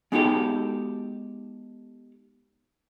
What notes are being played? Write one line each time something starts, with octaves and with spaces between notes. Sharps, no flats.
G#3 B3 D#4 F#4 G4 A4